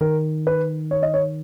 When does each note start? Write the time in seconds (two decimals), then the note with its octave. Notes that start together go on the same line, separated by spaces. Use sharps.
0.01 D#3 A#4
0.47 B4
0.91 C#5
1.03 D#5
1.14 C#5